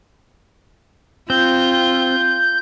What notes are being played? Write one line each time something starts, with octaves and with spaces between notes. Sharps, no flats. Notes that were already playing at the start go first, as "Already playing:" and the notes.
C4 F4 G6 G7